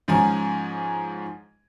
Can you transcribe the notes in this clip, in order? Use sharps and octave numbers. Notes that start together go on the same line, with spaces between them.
G#2 F3 C#4 G#5 A#5